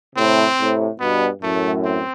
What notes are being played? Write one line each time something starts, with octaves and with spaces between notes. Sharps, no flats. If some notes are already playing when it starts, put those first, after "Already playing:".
A2 C3 C4
A2 C3
G2 B2 B3
F#2 A2 A3
C4